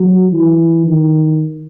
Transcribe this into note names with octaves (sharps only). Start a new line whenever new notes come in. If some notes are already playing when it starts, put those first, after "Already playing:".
Already playing: F#3
E3
D#3